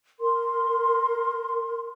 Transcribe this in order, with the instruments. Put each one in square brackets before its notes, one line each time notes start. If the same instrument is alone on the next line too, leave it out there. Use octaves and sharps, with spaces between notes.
[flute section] A#4 C6